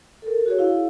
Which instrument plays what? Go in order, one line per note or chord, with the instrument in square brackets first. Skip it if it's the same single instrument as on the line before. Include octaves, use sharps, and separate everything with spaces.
[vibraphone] A4 A#4
F#4 G#4 C#5
E4 F5